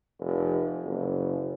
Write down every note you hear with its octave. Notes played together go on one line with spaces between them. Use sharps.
F1
F#1